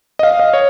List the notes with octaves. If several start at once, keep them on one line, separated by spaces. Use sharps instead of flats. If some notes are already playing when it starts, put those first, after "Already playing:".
D#5
F5
D#5
C#5